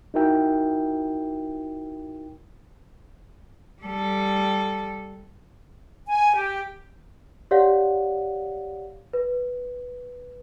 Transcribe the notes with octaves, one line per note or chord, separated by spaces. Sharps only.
D#4 E4 F#4 A#4 E5 G5
G3 A4
G#5
G4
G4 C#5 D5 F5 F#5
B4